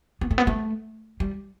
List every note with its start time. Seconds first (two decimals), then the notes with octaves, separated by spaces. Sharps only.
0.21 B3
0.31 A3
0.38 B3
0.47 A3
1.20 G3